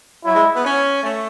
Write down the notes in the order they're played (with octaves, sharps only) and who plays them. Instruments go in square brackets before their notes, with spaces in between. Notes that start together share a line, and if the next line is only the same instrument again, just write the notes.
[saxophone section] F#3 [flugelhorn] E4
[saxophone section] G#3
B3
C#4
A3